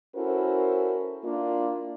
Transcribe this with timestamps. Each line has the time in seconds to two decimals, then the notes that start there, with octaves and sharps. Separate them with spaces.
0.16 C#4 E4 F#4 A4 A#4 C5
1.24 A#3 D4 E4 F4